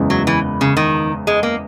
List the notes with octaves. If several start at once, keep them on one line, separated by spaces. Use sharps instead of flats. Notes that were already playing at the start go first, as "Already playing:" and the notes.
Already playing: F#1 E2 C#3 G#3
F#3
E3
C#3
D#3
G#3
A#3